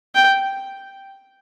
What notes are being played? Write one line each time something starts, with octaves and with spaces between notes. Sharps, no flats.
G5